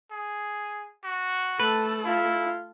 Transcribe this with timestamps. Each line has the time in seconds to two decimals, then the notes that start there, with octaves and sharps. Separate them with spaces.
0.11 G#4
1.04 F#4
1.60 A3 A4 B4
2.05 E4 F4